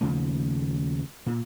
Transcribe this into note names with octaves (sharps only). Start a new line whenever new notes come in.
D#2 C#3 F3 A3
A#2